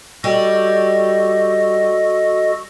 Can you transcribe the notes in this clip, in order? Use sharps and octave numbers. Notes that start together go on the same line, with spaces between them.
G3 F#4 A4 D#5